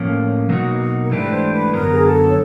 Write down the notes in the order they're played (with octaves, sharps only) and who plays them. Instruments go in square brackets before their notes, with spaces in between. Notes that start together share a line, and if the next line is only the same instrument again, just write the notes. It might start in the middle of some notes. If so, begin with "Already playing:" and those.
Already playing: [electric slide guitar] A2 F3 A#3 C#4
B2 F#3 A#3 D#4 F#4
[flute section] A#4
[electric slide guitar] G#2 E3 A3 D4 G4 [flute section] B4
[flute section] C5
B4
[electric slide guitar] F#2 D3 F#3 B3 [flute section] A#4
[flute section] G#4
A4
C#5